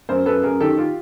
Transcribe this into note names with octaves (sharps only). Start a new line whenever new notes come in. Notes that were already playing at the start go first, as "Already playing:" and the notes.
F#2 A#4 C5
F#2 A4 B4
F#2 G#4 A#4
D#3 G4 A4
F4 G4